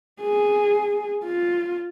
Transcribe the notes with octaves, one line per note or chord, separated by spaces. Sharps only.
G#4
F4